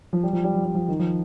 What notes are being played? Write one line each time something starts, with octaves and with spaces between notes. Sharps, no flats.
F3
G3
F3
G3
F3
G3
F3
D#3
F3